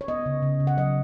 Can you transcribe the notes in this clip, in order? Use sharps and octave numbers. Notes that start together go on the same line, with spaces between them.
C#5
B3 D#5
C#3
C#3
C#3
F#5
F#3 D#5